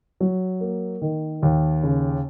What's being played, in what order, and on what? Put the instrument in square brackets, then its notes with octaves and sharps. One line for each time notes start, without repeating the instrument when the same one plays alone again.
[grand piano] F#3
A#3
D#3
D#2
C#3